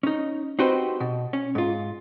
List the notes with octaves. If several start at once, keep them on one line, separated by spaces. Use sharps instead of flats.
C#4 D#4
C4 D#4 F#4 G4 B4 C5
B2
C#4
G#2 F4